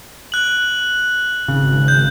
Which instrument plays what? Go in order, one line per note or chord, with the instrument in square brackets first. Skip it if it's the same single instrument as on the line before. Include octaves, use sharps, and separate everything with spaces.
[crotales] F#6 F#7
[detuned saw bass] G#1 [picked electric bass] C#3
[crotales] G6